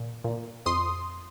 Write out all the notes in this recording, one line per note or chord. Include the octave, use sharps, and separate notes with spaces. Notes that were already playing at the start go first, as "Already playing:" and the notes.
Already playing: A#2
A#2
F2 C6 D#6